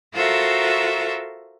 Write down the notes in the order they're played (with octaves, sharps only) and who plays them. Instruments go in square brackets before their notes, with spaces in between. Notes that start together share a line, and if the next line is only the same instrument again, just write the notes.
[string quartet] F4 F#4 A4 A#4 C5 E5